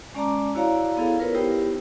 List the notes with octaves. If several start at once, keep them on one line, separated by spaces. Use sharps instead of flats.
G#3 C#4 D5 A5 A#5 D6
E4 F#4 C#5 D5 F5 A#5
B3 E4 G#4 A4 F5
F4 A#4 B4 C#5
B3 D#4 E4 G4 C5 G5